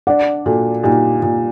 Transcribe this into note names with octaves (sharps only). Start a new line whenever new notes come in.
D4 D5 F#5
A#2 F#4 A4
A#2 D#4 G4
A#2